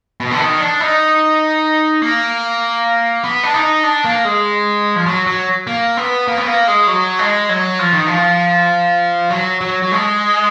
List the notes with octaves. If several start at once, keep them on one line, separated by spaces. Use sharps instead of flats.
B2
D3
D#3
D4
D#4
A#3
B3
D4
D#4
D4
A#3
G#3
F3
F#3
F#3
A#3
B3
A#3
B3
A#3
G#3
F#3
G#3
F#3
F3
D#3
F3
F#3
F#3
F#3
G#3